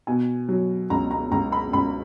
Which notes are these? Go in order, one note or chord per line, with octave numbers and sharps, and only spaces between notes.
B2 G#5
F#3
C#2 A#5
A#5
C#2 A#5
B5
C#2 B5